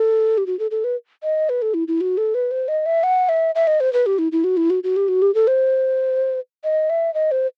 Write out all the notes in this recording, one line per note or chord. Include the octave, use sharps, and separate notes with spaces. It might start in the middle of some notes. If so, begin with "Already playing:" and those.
Already playing: A4
G4
F#4
A4
A4
B4
D#5
B4
A4
E4
E4
F#4
A4
B4
C5
D#5
E5
F#5
E5
E5
D#5
C5
B4
G4
E4
E4
F#4
E4
F#4
F#4
G4
F#4
G4
A4
C5
D#5
E5
D#5
C5